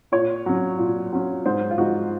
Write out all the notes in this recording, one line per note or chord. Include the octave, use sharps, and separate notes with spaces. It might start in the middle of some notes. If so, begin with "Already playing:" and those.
A#2 C#5
F#3 C#4
A#2
F#3 C#4
G#2 C5
F4
F3 G#3 D#4 F#4